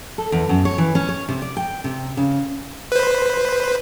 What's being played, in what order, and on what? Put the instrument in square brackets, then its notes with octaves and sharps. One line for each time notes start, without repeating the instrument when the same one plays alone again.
[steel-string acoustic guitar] A4
E2
F#2
C#5
E3
C#4
C#5
C3
D5
G5
C3
C#3
[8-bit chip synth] B4 C5